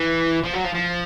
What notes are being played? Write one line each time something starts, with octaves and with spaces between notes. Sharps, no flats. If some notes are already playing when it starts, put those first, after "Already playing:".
Already playing: E3
F3
F#3
F3
F3